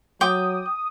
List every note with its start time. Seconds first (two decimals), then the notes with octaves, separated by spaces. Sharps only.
0.21 F#3 G5 D6 D#6